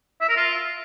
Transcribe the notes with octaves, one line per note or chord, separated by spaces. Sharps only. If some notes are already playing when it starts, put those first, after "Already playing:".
E5
A#4
F4